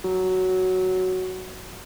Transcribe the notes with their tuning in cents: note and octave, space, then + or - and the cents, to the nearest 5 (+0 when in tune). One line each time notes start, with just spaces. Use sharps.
F#3 +5